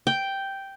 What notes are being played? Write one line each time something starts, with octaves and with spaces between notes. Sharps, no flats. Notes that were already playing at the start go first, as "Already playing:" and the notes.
G5